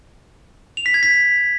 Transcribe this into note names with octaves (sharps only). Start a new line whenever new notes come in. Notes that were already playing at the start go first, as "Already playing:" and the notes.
F7
B6
G#6
B6